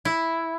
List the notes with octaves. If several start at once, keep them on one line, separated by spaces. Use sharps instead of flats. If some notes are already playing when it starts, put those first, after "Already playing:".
E4